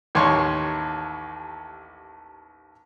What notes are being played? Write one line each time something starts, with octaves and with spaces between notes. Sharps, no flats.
A1 D#2 C#5 C6 C#6